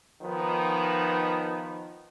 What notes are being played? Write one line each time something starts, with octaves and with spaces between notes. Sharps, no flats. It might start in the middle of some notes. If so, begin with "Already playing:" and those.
D#3 F3 B3 D#4